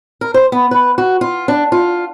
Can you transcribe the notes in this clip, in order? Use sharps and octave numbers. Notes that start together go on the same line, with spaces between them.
A#4
C5
B3
B4
F#4
F4
D4
F4